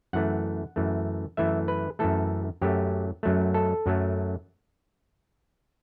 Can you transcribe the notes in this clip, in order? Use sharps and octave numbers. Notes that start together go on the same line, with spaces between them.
F#2 E3 A3 F#5
F#2 E3 A3
F#2 E3 A3 E5
B4
F#2 E3 A3 A4
F#2 F#3 A3 G4
F#2 F#3 A3
A4
F#2 F#3 A3